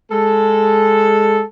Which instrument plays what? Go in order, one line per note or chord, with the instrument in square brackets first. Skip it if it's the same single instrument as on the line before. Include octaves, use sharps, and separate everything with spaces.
[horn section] G#3 A4